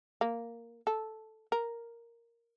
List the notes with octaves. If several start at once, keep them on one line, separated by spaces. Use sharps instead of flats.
A#3
A4
A#4